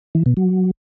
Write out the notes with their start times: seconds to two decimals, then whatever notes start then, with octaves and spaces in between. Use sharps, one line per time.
0.15 E3
0.26 B2
0.37 F#3